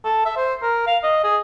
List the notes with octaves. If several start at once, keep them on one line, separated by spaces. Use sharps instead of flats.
A4
E5
C5
A#4
F5
D#5
G#4